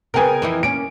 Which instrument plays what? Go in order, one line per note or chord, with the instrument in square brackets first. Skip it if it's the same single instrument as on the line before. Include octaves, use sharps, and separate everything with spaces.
[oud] C#3 B3 [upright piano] A#4 G5 G#5
[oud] F2 E3 E4
[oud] A#3 C#4 [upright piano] D7